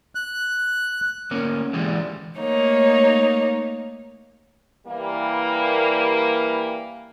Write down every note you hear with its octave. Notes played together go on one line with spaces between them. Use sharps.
F#6
D2 A#3 C#4
D3 E3 G3 G#3
A3 A#3 D#4 C#5
E3 G3 A#3